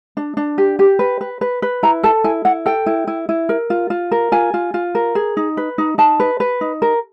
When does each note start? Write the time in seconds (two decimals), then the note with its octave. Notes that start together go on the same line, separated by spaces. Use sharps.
0.17 D4
0.37 D4
0.58 G4
0.79 G4
0.99 B4
1.21 B4
1.41 B4
1.62 B4
1.83 E4 A#5
2.03 A4 A5
2.24 E4 G#5
2.45 E4 F#5
2.66 A4 G5
2.86 E4
3.07 E4
3.29 E4
3.49 A#4
3.70 F4
3.90 F4
4.12 A#4
4.32 F4 G#5
4.54 F4
4.74 F4
4.95 A#4
5.15 G#4
5.37 D#4
5.57 B4
5.78 D#4
5.98 D#4 A5
6.20 B4
6.40 B4
6.61 D#4
6.82 A#4